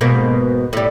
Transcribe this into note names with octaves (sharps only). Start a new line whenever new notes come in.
G#2 B2 A#3
A2 G3